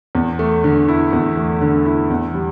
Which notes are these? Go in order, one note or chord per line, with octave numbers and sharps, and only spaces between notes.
E2
A3
D3
E4
E2
A3
D3
E4
E2
G3